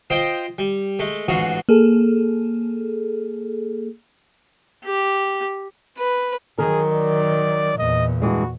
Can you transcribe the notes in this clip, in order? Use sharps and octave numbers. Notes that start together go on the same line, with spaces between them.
F4 C5 D#5 G5 C6
G3
G#3 A3
A1 G#2 F4 F#4 D#6
A#3 G#4 A4
G4
B4
D#3 F#3 G#4 A#4
D5
E2 A#2 D#5
G2 E3 G#3 F#4